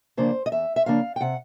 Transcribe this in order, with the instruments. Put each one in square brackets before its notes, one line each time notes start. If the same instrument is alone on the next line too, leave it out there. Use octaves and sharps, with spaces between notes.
[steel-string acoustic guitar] C#3 F3 A#3 D4 C5
D#5
E2 E5
E5
C#3 F3 A#3 D4 F5
G5
C3 F#5